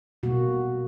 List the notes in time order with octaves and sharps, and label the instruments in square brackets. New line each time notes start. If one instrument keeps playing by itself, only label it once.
[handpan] B2 G3 A#3 F#4